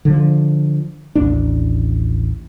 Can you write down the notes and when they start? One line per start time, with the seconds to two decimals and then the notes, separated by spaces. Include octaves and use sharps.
0.05 D3 F3
1.15 A1 D#2 D4